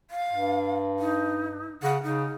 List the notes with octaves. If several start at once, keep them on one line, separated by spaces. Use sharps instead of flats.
F5
G2
D#4
C#3 F#5
C#3 D#4